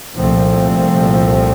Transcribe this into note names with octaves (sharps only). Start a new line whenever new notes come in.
C2 A#2 F3 A3 C4